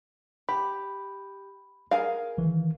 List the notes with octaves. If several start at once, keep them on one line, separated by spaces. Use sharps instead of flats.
G4 B5
G#4 A#4 F5
A1 D#3 E3